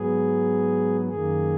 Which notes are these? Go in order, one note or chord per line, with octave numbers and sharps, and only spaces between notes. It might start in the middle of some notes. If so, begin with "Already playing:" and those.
Already playing: G#2 F#3 B3 G#4
F#2 D#3 A#3 G#4